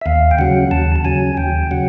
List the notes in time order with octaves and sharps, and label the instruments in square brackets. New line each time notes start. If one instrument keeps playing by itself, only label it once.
[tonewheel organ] E5
D#2 F5
G5
C#3 F#3 F#5
D#2 A5
A5
C#3 F#3 G#5
D#2 G5
C#3 F#3 F#5